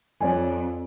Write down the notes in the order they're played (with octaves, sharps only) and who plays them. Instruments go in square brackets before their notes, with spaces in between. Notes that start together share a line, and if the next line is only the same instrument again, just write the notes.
[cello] F2 [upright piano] C#5 D5 G#5